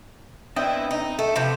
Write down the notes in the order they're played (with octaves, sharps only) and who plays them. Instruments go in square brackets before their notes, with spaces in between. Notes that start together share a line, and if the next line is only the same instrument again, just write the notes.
[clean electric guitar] B3 C4 D4 [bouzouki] E4 [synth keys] D#5 G5
[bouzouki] D#4
[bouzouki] A3 [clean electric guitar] A4
[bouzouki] C3 F3 B3